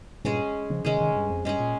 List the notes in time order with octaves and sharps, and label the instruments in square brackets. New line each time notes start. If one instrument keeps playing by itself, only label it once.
[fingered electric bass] G2 A#2 [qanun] G#3 C#4 G#4
[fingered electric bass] C#3 F3
[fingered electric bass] C3 D#3 [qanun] G#3 C#4 G#4
[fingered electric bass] C3 D#3
G2
F2
[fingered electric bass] G2 [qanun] G#3 C#4 G#4
[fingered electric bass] A#2